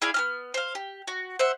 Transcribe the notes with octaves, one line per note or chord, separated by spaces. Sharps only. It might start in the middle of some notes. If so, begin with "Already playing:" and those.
E4 G#4 D5 F5
B3 G4 F6
C5 F5
G4
F#4
C5 E5 F#5